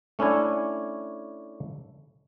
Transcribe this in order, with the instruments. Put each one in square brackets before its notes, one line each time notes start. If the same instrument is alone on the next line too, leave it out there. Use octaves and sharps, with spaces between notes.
[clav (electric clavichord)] A3 C#4 D4 E4 G#5